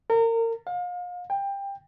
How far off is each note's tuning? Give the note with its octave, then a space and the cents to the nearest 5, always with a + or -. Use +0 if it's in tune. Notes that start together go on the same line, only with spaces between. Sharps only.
A#4 -30
F5 +35
G5 +20